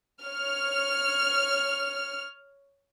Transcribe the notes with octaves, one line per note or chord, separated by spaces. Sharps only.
C#5 F6